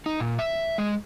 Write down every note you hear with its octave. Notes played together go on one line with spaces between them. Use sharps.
D#4
A#2
E5
G#3